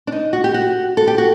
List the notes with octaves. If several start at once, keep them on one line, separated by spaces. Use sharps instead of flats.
D4
D#4
F#4
G4
F#4
A4
G4
F#4